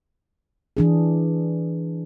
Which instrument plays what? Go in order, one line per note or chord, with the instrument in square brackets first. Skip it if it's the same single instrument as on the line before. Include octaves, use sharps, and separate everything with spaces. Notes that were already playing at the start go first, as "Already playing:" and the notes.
[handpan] E3 D4 G#4